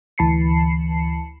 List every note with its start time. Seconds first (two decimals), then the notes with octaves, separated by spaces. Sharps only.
0.18 D2 E3 A5 B5 C7 C#7